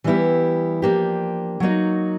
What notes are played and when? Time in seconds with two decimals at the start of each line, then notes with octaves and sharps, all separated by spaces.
0.04 E3 G3 B3 E4 G4
0.82 F3 A#3 D4 G4
1.60 F#3 A#3 D#4 F#4